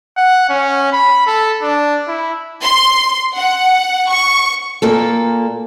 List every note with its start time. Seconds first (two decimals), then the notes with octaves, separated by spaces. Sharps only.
0.17 F#5
0.50 C#4
0.93 B5
1.27 A4
1.63 D4
2.08 E4
2.63 C6
3.36 F#5
4.10 C#6
4.82 A#2 A#3 A4